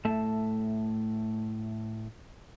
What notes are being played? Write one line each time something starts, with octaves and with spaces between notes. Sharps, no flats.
A2 A3 A4 E5 A5